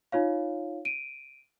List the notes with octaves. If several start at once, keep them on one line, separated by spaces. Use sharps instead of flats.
D#4 F4 C#5 F5
D7 D#7